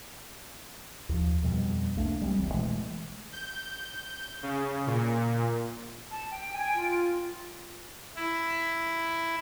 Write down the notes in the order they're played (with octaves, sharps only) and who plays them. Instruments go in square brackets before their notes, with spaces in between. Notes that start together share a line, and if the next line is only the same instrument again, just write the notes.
[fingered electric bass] D#2 F3
F2 B2 G3
C2 A3 A#3 D4
G3 G#3 C4
F1 C#2 E3
B2 E3 G#3 A3
[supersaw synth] G6
C#3
A#2
[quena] A5
G5
[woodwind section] G#5
F4
[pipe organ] E4